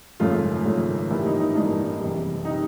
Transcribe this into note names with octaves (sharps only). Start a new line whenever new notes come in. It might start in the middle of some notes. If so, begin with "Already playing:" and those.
G#1 F#2 C#3 F3 A3 F4
G#1 F#2 C#3 F3 A3
A1 G2 E3 G3 A#3 E4
D#4
D#4
A1 G2 E3 G3 A#3 D4
F#1 E2 C3
C3 D#4